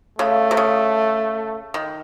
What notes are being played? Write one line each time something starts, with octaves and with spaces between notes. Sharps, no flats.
C#3 A3
C3
C#3
D#3